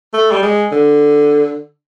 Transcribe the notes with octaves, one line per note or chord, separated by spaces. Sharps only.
A3
G3
G#3
D3